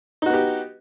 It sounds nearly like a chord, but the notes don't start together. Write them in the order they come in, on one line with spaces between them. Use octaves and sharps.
D#4 F#4 B3 G4